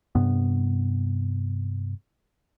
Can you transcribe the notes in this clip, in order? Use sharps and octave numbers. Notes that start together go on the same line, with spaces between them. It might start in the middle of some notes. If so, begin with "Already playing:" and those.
G2 C3 B3